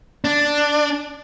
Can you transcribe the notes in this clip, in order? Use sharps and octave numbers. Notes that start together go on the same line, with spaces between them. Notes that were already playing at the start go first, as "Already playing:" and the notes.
D4